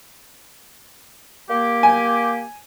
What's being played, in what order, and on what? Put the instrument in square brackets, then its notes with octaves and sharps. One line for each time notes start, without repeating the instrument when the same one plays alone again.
[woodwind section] A#3 G4
[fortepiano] G#5